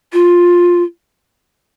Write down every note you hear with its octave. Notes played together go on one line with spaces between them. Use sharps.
F4